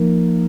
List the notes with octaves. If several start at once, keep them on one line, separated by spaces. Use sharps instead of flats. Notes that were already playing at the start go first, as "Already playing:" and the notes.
Already playing: F3 A#3 D#4 A#4